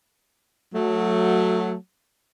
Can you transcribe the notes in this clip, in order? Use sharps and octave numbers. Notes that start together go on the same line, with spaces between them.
F#3 A3